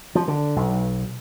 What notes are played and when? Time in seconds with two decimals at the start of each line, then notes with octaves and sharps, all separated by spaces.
0.15 F3
0.28 D3
0.56 B1